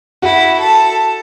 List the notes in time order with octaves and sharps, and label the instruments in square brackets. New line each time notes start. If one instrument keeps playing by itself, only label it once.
[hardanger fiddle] E4 [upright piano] F#4 F#5
[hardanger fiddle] A4